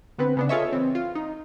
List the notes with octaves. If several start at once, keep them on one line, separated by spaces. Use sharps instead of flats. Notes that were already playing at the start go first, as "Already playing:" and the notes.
D3 B3 C4 B4
C#3 B3 D4
F4 G#4 A4 C#5 D#5 E5
E3 C4
F4
D#4